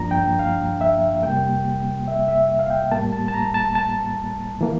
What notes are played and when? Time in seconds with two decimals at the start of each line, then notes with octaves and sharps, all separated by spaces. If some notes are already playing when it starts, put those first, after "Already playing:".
Already playing: G2 F3 A#3 D4 A#5
0.11 G5
0.39 F5
0.81 E5
1.23 F2 C3 G3 A#3 G5
2.08 E5
2.28 E5
2.59 F5
2.70 G5
2.91 A2 G3 A#3 A5
3.13 A5
3.28 A5
3.34 A#5
3.54 A5
3.75 A5
4.61 E3 A#3